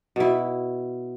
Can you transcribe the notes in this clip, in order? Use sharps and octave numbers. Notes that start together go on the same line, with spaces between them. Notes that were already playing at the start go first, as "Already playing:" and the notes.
B2 E4